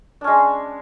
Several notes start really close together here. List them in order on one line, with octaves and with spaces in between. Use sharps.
D4 C#4 G#3